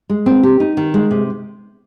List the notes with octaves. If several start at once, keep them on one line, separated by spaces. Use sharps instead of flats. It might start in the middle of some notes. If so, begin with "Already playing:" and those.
G#3
C4
G4
D#4
D#3
G#3
C3